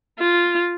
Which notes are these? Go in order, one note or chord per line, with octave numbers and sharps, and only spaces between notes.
F4